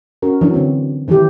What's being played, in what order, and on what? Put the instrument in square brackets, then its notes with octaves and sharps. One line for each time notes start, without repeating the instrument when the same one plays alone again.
[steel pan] C#4 F#4 A#4
E3 F#3 D4
D3 C4
D#3 E3 F#3 E4 G4